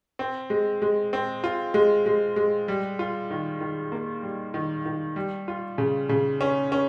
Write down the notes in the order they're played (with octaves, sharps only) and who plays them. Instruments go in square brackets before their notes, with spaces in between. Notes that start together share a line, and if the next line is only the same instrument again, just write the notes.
[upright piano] C4
G#3
G#3
C4
F4
G#3
G#3
G#3
G3
F4
D#3
D#3
A#3
G3
D#3
D#3
G3
F4
C#3
C#3
C#4
C#4